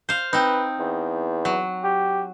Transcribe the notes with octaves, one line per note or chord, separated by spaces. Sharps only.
C5 F5
C4 D#4 B4
E2
F#3
G4